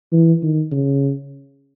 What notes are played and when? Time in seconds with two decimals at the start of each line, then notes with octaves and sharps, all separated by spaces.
0.12 E3
0.42 D#3
0.72 C#3